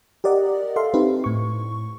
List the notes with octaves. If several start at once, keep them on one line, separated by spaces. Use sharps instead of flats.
G4 A#4 D5 D#5 F#5
A4 E5 F5 C6
C4 D#4 G4 B4
A2 C#6